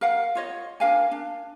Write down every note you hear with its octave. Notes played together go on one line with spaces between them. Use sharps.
A#4 F5 F#5
F4 C#5 D#5
D4 A#4 F5 G#5
D4